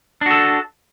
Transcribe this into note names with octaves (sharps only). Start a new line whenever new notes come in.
D4 F#4 A4